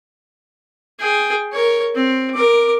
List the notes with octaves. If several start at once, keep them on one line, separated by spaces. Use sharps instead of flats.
G#4 G5
A#4 C#5
C4
A#4 D6